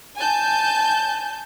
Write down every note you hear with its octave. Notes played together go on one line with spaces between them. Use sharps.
G#5 A5 G6